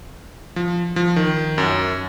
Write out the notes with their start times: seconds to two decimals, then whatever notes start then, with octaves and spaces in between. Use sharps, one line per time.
0.56 F3
0.96 F3
1.16 D#3
1.58 F#2